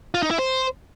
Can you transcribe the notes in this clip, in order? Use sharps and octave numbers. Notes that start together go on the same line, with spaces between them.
F4
D#4
E4
C5